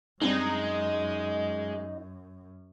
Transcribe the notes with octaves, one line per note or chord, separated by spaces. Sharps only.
F#2 G3 G#3 C4 D4 D#4